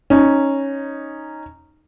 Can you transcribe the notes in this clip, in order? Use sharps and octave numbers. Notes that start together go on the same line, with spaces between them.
C#4 D#4